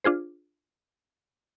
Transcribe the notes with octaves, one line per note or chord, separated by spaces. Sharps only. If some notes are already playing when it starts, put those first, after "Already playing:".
D4 F4 G#4 C5